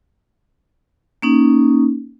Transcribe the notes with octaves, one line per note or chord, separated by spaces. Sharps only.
A#3 C#4 D#4